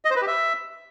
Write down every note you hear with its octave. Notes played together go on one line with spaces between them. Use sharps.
D#5
C5
B4
G4
E5